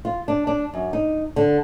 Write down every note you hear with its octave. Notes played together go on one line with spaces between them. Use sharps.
F4
D4
D4
F#2
D#4
D3